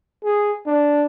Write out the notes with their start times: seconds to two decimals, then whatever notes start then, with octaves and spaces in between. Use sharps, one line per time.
0.24 G#4
0.67 D4